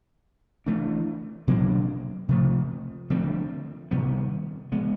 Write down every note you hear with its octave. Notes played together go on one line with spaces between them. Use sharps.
E3 A3 D4
B2 F#3 A#3 D4
C3 F3 A3
D3 F3 A3 C4
C3 D#3 G3 B3
E3 G#3 B3